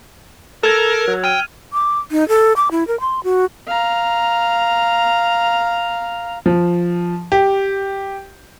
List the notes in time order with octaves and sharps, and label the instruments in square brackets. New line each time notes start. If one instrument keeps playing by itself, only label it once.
[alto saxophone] A4 [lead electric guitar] A#4 [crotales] E6 G#6 F7
[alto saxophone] F#3
[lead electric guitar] G5 [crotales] F6 G#6 D#7
[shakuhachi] D6
D#4
A4
D6
E4
A#4
C6
F#4
[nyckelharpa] F5 A#5
[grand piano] F3
G4